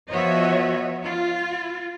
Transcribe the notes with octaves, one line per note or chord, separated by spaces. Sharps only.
F3 B3 F#4 C#5 D#5 E5
F4